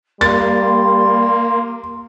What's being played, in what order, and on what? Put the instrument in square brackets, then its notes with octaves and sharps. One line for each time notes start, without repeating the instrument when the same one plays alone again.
[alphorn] G3 [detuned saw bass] A#3 [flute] C6 [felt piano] A6